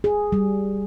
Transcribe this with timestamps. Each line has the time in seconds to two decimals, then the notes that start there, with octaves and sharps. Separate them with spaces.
0.04 G#4
0.32 G3